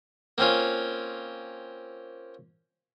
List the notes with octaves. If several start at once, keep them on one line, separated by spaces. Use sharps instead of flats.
A#3 C4 C#4 F4